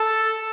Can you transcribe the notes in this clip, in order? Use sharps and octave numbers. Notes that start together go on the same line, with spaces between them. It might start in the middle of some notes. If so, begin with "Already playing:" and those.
Already playing: A4